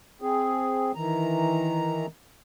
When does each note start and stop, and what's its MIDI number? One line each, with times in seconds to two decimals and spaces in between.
0.21 0.92 60
0.21 0.92 68
0.95 2.06 51
0.95 2.06 52
0.95 2.06 82